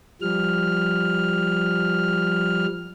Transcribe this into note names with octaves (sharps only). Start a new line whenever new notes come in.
F3 G3 F6